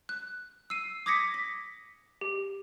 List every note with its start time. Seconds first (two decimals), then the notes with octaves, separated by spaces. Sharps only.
0.09 F#6
0.70 E6 C7 D#7
1.06 D6 D#6 G#6 A#6 B6 C#7
1.34 B6
2.21 G4